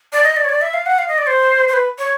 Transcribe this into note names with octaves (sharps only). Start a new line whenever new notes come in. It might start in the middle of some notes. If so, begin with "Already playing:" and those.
D5
D#5
D5
C#5
D5
E5
F5
F#5
F5
D#5
D5
C5
C5
B4
C#5